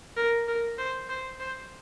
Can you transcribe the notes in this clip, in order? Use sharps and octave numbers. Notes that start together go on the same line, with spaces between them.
A#4
A#4
C5
C5
C5